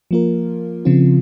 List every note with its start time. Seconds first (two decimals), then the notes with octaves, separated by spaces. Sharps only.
0.11 F3 A#3 F4 A#4
0.85 C#3 F3 C4 F4